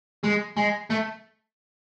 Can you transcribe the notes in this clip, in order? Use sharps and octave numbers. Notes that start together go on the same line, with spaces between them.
G#3
G#3
A3